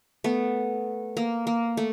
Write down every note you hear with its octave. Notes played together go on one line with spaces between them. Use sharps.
A3 B3
A#3
A#3
A3